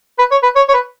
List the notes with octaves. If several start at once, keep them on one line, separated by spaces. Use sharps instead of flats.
B4
C#5
B4
C#5
C#5
B4